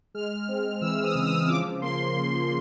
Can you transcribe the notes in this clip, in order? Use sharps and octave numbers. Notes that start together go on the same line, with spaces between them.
G#3 F6
C4
E3 E6
D#6
C#3
D#6
F3 D6
A#3 C6
C#3